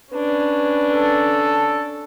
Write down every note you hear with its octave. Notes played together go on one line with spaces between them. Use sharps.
C#4 D4 B4
A4